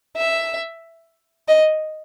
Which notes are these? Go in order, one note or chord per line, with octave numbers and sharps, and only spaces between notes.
E5
D#5